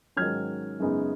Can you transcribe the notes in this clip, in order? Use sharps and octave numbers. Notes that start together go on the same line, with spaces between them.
G#2 D#3 F#3 C#4 F6 G#6
F#2 C#3 G#3 B3 D#4